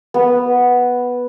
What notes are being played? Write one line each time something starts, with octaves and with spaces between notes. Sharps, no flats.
B3